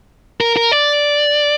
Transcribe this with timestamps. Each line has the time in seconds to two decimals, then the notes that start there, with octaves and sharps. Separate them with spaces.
0.41 A#4
0.57 A#4
0.72 D5